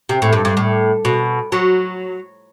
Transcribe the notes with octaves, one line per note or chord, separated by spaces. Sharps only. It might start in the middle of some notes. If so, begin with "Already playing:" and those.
C3
A2
G2
G2
A2
B2
F#3